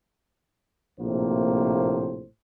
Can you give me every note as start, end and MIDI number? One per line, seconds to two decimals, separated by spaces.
1.00 2.25 34
1.00 2.25 45
1.00 2.25 48
1.00 2.25 58
1.00 2.25 72